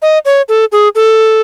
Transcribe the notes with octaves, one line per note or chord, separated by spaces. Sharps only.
D#5
C#5
A4
G#4
A4